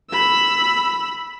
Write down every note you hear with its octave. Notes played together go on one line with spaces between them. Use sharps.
B5 E6